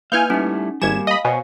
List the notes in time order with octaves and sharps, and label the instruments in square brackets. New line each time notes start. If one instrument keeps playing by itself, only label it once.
[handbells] A#3 B4 [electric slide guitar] E4 F5 [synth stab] G#5 F6 G6
[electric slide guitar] G3 A3 E4 [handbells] C#4 D#4
[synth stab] G#1 G#6 E7 [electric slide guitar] G3 A#3 [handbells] G#5
[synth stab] D#5 B5 [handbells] F5
[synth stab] B2 [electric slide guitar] C5 C#5 G#5